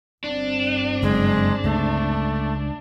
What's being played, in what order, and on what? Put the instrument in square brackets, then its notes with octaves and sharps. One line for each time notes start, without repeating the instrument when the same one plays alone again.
[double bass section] G1 C4 [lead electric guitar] D4
[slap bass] F#1 [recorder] G#3
[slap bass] C#2 [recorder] A3